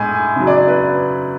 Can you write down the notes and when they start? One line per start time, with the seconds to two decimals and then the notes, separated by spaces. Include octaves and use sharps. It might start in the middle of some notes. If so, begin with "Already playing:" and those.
Already playing: A2 G#3 G#5
0.36 C#3 F#3
0.47 D5
0.57 D5
0.68 B4